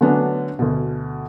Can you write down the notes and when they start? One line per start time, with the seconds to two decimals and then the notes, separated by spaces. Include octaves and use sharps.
0.01 D3 F#3 A3 B3 C#4 D4
0.59 D2 B2